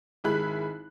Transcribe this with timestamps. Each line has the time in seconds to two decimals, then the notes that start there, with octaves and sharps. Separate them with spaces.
0.24 G#1 G#3 E4 B5 F#6